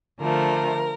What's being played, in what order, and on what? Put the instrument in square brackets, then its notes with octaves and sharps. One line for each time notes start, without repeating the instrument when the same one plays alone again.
[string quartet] D3 F3 A3 A#4